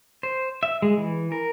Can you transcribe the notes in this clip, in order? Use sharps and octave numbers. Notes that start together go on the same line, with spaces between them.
C5
E5
G#3
E3
A#4